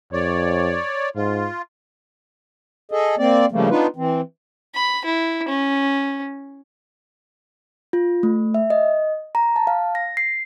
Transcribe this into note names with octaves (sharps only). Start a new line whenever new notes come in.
F2 C#5 D5
G#2 F4
G#4 A4 D#5
A#3 C4 D5
C#3 F3 G3 A3 A#3
B3 D4 D#4 F4 B4
E3 C4
B5
E4
C#4
F4
A3
E5
D#5
A#5
A5
F5
A#6
C7